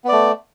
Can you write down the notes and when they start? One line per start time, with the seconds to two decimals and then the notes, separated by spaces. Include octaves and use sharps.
0.04 B3
0.08 D5
0.12 A3